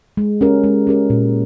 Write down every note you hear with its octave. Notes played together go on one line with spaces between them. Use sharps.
G#3
C#4 G4 A#4
G#3
C#4 G4 A#4
A#2